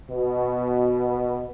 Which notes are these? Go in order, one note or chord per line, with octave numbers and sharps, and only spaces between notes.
B2